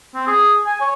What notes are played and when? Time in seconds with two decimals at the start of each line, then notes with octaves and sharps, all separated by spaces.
0.15 C4
0.27 G#4
0.66 G#5
0.81 C#5